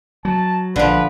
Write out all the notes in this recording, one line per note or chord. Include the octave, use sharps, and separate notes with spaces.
F#3 A5
A#1 D3 F3 B4